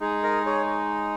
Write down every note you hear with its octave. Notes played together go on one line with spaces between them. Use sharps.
G#3 D#4 G#4
A#4 D#5
G#4 C#5